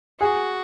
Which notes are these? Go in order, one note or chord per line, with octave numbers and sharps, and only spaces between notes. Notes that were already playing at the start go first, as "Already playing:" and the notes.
F#4 G#4